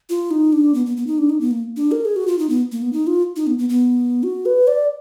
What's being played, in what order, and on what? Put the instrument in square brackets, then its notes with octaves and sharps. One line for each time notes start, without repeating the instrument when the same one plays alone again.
[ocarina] F4
D#4
D4
B3
B3
B3
D#4
D4
D#4
B3
A#3
D4
A#4
G#4
F#4
F4
D#4
B3
A#3
B3
D#4
F4
D#4
B3
B3
B3
F#4
B4
D5